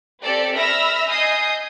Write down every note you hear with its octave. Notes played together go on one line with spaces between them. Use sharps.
C4 G4 A4 D5
E5 B5 E6 F6 A#6
D#5 G#5 D#6 G6 C7